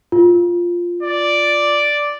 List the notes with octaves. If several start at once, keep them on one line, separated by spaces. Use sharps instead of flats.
F4
D5